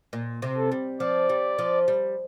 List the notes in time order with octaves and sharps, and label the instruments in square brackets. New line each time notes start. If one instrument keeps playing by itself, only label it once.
[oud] A#2
C3
[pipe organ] A4
[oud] G3
[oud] F3 [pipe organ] D5
[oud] G3
F3
G3